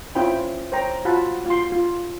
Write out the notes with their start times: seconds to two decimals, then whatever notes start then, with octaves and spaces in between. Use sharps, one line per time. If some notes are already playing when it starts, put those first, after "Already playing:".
0.15 C#4 E4 F4 C5 G5 B5
0.72 C5 C#5 G5 A#5
1.05 F4 F#4 F#5 A5 B5
1.46 F4 C6
1.72 F4